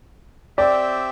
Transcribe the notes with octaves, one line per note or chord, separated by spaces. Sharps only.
C4 G4 D5 E5 G5